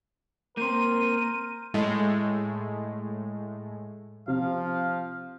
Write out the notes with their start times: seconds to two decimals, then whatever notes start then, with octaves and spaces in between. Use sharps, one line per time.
0.57 A#3 C4 A#4 C6 G6 D#7
1.74 A2 G#3
4.28 C3 F3 F5